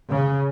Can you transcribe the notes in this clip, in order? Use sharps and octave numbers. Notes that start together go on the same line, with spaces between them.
C#3